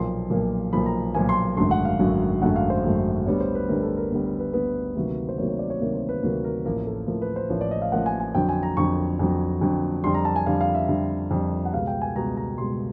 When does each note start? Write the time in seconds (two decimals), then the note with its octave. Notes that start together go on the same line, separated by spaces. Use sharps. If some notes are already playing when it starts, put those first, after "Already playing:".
Already playing: B1 A#2 F3 A#3 C6
0.30 B1 A#2 F3 A#3
0.72 B1 A#2 F3 A#3 B5
0.86 A#5
1.15 B1 A#2 F3 A#3 G#5
1.29 C6
1.57 G#1 F#2 D3 F#3 A3 C6
1.71 F#5
1.85 F5
1.99 G#1 F#2 D3 F#3 A3
2.42 G#1 F#2 D3 F#3 A3 F#5
2.56 F5
2.70 C5
2.84 G#1 F#2 D3 F#3 A3
3.27 D2 D3 G3 B3 C#5
3.40 C5
3.55 B4
3.69 D2 D3 G3 B3 A#4
3.83 A4
3.97 A#4
4.11 D2 D3 G3 B3
4.25 A#4
4.39 B4
4.53 D2 D3 G3 B3 B4
4.96 D2 C3 D#3 F#3 A#3
5.29 C5
5.38 D2 C3 D#3 F#3 A#3 C#5
5.49 C#5
5.59 D5
5.70 C#5
5.81 D2 C3 D#3 F#3 A#3
5.95 C5
6.09 B4
6.23 D2 C3 D#3 F#3 A#3 A#4
6.44 A#4
6.65 A1 A2 F3 A#3 A#4
6.87 A4
7.07 A1 A2 F3 A#3 A#4
7.22 B4
7.36 C5
7.50 A1 A2 F3 A#3 C#5
7.61 D5
7.71 D#5
7.82 F5
7.92 A1 A2 F3 A#3 F#5
8.06 G#5
8.20 G#5
8.35 F2 D3 F#3 G5
8.49 G#5
8.63 A#5
8.77 F2 D3 F#3 C#6
9.19 F2 D3 F#3
9.61 F2 D3 F#3
10.04 F2 D3 G3 C6
10.14 A#5
10.25 A5
10.36 G#5
10.46 F2 D3 G3 F5
10.61 F5
10.75 E5
10.88 F2 D3 G3
11.31 F2 D3 G3
11.65 F#5
11.73 C#2 B2 G3 F5
11.87 G5
12.02 G#5
12.16 C#2 B2 G3 A#5
12.37 A#5
12.58 C#2 B2 G3 C6